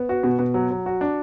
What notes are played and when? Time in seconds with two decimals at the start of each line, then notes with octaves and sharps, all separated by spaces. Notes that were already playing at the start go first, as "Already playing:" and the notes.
Already playing: B3
0.09 F#4
0.23 B2
0.39 B2
0.54 F#3
0.70 F#3
0.86 F#4
1.01 D4